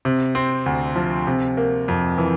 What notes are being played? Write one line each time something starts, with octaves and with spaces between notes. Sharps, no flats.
C3
C4
D2
F3
C3
A#3
F2
E3